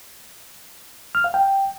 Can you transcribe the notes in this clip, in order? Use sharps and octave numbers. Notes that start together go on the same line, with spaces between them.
F6
F5
G5